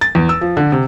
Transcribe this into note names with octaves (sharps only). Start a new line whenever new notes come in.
A6
E2
E6
F3
D3
C3